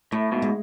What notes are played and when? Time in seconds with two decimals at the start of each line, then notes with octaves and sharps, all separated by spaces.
0.12 A2 A3
0.32 G#2 B2
0.42 G#3